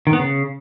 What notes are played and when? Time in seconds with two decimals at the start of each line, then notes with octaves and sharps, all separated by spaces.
0.07 D#3
0.13 B3
0.19 C#3